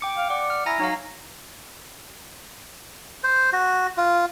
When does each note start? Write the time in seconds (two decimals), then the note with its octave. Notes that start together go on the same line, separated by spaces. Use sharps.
0.01 G5 D6 C#7
0.17 F5
0.30 D5 F#5
0.50 F6
0.66 E4 G#5 A#5 A#6
0.80 F#3 D#4 F5
3.24 C5
3.53 F#4
3.97 F4